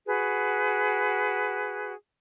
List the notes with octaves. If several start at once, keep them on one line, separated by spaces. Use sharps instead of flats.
F#4 G#4 B4